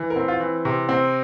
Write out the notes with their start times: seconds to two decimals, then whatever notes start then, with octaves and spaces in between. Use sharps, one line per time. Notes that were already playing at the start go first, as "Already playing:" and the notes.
Already playing: E3
0.10 A#4
0.16 C4
0.28 F4
0.40 E3
0.65 C3
0.89 C4